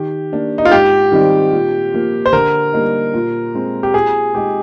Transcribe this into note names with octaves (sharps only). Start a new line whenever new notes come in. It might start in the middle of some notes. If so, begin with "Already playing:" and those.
Already playing: D#3 G4
A#3 D4
D#4
F4
G#2 G4
D#3 G3 C4 D#4
A#2
F3 A#3
C5
D3 A#4
G3 A#3 D#4
A#2
G#3 C4
G4
A#2 G#4
G#3 D#4 G4